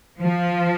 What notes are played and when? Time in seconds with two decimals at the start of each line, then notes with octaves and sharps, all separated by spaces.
0.20 F3